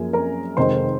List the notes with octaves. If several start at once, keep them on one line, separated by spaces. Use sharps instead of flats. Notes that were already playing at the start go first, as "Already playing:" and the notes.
Already playing: F#2 F3 A#3 G#4 G#5
A#4 A#5
F1 F2 D#3 G#3 C5 C6